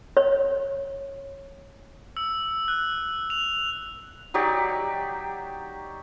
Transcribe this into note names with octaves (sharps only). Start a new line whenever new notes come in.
C#5
E6
F#6
F7
F#3 D#4 G4 D5